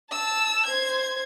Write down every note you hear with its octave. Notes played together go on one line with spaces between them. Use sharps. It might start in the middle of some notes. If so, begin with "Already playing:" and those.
A5 E6
C5 G#6